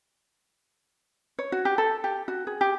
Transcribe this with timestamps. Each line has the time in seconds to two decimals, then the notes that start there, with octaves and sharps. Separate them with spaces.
1.39 C#5
1.52 F#4
1.65 G4
1.78 A4
2.04 G4
2.28 F#4
2.47 G#4
2.61 G4